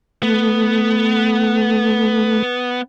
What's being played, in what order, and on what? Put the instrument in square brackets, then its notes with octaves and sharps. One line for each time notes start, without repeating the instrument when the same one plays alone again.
[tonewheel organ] A3 [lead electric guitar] B3